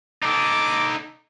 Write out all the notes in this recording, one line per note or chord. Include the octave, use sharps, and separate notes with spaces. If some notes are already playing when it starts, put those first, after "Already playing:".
D#4 A4 D6